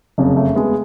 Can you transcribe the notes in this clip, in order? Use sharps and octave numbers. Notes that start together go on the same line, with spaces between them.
F#1 F2 C#3
A3
G#3 B3